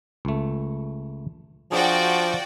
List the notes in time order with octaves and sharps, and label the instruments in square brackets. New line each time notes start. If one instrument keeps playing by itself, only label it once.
[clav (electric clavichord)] C#2 A3
[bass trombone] F3 [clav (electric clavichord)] D4 G#4 [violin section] F#4 D5 G5